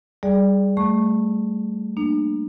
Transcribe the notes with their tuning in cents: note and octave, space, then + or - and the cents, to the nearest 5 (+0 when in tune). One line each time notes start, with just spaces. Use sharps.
G3 +0 G#4 +0 D5 +0
A3 +0 C#6 -15
A#3 +0 D4 +35